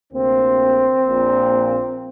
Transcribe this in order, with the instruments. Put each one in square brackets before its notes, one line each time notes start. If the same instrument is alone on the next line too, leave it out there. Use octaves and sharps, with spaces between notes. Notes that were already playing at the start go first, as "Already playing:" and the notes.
[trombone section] D2 C3 A#3 C4
A#1 A#2 A#3